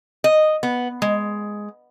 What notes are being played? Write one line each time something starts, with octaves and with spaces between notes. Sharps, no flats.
D#5
B3
G#3